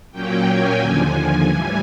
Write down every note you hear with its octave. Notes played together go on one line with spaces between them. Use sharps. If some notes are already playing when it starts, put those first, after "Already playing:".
A#2 F#3 A#3 C#4 G5
G#5
D#2 D3 F3
A2 E3 G3 G#5